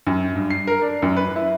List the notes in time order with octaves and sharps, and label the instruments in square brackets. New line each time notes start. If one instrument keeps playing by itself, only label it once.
[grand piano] F#2
G2
C7
A#4
D4
F#2
B4
E4